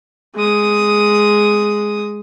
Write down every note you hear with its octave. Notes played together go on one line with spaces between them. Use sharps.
G#3 D#6